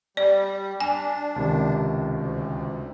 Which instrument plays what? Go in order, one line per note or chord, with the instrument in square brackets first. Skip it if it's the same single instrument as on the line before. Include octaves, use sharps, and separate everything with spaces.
[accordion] G3 [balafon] D5
[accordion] D4 [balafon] G#5
[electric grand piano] C#2 C3 D#3
[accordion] D2